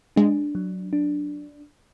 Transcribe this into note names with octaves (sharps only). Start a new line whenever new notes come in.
G#3 D4
F#3
D4